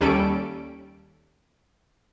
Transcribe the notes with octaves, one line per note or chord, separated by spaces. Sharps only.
D#2 G3 C#4 A4 D7